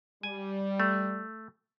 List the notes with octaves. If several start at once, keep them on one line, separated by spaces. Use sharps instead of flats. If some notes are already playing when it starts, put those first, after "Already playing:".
G3 G#5
A3